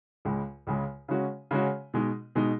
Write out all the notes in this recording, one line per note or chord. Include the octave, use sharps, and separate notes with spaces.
C#2 C#3 G#3
C#2 C#3 G#3
C#3 G#3 C#4 F#4
C#3 G#3 C#4 F#4
B2 G#3 D#4
B2 G#3 D#4